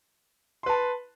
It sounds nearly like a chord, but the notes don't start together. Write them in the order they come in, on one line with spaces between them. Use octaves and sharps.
C6 B4 A5